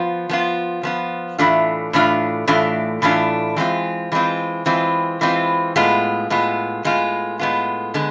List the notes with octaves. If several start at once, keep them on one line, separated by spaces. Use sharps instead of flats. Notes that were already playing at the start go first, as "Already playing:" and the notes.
Already playing: F3 B3 F4
F3 B3 F4
F3 B3 F4
A2 E3 A3 D4 F4
A2 E3 A3 D4 F4
A2 E3 A3 D4 F4
A2 E3 A3 D4 F4
E3 G#3 C4 F4
E3 G#3 C4 F4
E3 G#3 C4 F4
E3 G#3 C4 F4
A2 G#3 B3 F4
A2 G#3 B3 F4
A2 G#3 B3 F4
A2 G#3 B3 F4
D3 G#3 B3